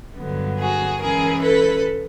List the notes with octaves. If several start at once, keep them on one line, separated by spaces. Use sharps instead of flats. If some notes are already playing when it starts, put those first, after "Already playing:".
G2 D3 F#3 B3
F#4 G#4
E3 G#3 C#4 E4 G#4 A#4
A4 B4